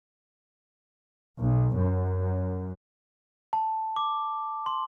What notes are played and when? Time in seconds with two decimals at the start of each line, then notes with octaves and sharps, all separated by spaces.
1.41 B1
1.78 F#2
3.53 A5
3.96 D6
4.66 C6